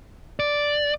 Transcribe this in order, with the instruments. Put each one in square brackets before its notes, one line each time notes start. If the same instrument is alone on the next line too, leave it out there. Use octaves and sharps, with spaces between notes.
[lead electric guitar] D5